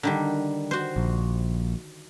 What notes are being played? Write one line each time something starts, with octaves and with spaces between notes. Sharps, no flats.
D3 D#3 G3
F#4 C5
A#1